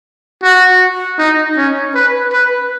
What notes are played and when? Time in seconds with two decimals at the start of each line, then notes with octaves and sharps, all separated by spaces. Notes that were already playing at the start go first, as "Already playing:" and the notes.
0.43 F#4
1.19 D#4
1.57 C#4
1.95 B4
2.33 B4